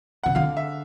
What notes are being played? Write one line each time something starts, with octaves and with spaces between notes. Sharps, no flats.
C#3 F#5
D3 F5
E5